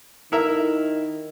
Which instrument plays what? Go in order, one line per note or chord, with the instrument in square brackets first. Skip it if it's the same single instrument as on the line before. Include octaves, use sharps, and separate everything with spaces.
[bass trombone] D#3 [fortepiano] E4 A#4 E5